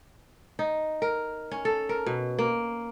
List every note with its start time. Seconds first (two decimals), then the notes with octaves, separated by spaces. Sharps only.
0.59 D#4
1.02 A#4
1.51 C#4
1.65 A4
1.89 A#4
2.06 B2
2.38 A#3